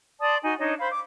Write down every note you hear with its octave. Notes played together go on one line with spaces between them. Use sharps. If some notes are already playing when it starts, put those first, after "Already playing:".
D5 A5 C6 D#6
D#4 F#4 G#5
D4 D#4 C#5 D#5
C5 F5 B5
D6